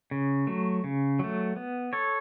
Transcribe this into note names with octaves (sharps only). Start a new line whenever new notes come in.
C#3
F#3 A3
C#3
F#3 A3
B3
A4 C#5